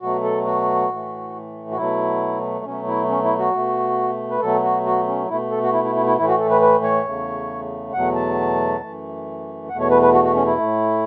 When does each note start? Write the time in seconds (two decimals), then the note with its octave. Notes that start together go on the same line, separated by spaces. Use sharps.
0.01 B2 F#3 A3 F#4
0.23 A4
0.46 F#4
0.90 A2 E3 A3
1.71 F#4
1.77 B2 F#3 A3 E4
2.66 B2 F#3 A3 C#4
2.87 E4
3.09 C#4
3.24 E4
3.39 F#4
3.54 B2 A3
4.31 B4
4.41 B2 F#3 A3 A4
4.63 F#4
4.86 F#4
5.07 C#4
5.29 B2 A3 E4
5.51 A4
5.63 F#4
5.73 E4
5.84 E4
5.95 E4
6.06 E4
6.17 A2 E3 A3 E4
6.28 F#4
6.39 A4
6.50 B4
6.61 B4
6.84 C#5
7.05 E2 C#3 A3
7.93 E2 B2 F#3 A3 F#5
8.15 A5
8.81 F#2 E3 A3
9.69 E2 B2 A3 F#5
9.80 C#5
9.91 B4
10.02 B4
10.13 F#4
10.24 F#4
10.35 C#4
10.46 E4
10.57 A2 A3